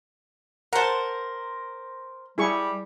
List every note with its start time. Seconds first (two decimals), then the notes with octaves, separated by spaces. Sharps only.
0.73 A#4 C5 F#5 A5
2.38 G3 E4 G#4 C#6